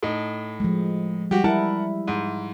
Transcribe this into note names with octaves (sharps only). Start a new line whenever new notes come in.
A2 D#4
F3 G#3
G3 F#4 G4
E4 A#4 F#5 A5
G#2